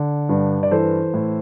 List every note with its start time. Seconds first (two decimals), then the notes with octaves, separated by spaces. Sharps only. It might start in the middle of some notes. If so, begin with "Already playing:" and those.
Already playing: D3
0.29 G2
0.63 D5
0.71 E3 A4 C5
1.14 A2